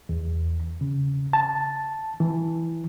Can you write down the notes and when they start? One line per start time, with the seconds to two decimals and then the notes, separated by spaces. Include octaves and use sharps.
0.09 E2
0.81 C#3
1.33 A5
2.20 E3